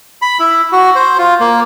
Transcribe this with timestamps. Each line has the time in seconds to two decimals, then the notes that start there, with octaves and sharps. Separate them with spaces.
0.22 B5
0.40 E4
0.72 F#4
0.95 C5
1.18 F4
1.40 A#3